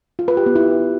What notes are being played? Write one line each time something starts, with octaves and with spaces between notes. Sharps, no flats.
F4
B4
G4
B3
E4